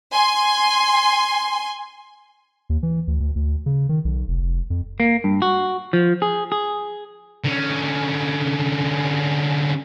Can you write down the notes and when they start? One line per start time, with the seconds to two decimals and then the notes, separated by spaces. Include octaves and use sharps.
0.13 G#5 C6
2.69 D#2
2.83 E3
3.07 D2
3.20 D2
3.36 D2
3.66 C#3
3.89 D#3
4.05 B1
4.28 F1
4.70 F2
5.00 A#3
5.24 G2
5.42 F#4
5.93 F3
6.22 G#4
6.52 G#4
7.45 D3 C#4